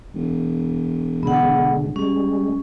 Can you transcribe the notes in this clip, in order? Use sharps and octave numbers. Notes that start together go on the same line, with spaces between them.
E1
B2 D3 G#3 B3 F#5
G3 G#3 C#4